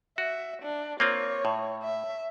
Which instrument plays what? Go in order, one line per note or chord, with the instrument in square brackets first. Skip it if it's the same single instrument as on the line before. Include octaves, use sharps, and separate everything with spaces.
[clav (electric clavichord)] F#4 [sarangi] E5
[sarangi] D4
[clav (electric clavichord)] A#3 C4 F4 [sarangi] C#5
[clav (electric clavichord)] A2
[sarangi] E5